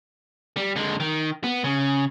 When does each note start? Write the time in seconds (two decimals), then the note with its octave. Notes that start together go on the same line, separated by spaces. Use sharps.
0.57 G3
0.76 D3 G#3
1.00 D#3
1.44 B3
1.64 C#3